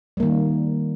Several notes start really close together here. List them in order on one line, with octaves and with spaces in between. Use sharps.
G3 A#3 D#3